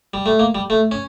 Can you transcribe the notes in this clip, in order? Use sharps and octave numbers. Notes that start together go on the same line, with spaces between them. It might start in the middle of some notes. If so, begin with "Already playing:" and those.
G3
A3
A#3
G3
A3
C#4